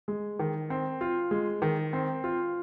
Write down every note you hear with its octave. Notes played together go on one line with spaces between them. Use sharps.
G#3
D#3
C4
F4
G#3
D#3
C4
F4